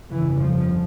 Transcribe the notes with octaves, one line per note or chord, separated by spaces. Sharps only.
G1 F2 C#3 E3
F3